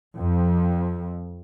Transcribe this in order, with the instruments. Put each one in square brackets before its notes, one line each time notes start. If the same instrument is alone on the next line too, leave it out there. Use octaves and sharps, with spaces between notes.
[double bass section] F2